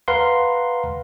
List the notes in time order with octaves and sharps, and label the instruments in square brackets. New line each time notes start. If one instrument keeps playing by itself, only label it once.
[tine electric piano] B4 F5 F#5 A#5 C6